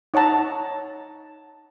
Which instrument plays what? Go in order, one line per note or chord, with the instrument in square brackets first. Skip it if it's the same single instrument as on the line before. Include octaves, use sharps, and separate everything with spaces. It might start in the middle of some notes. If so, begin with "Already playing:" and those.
[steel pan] D#4 C#5 F#5 A5 A#5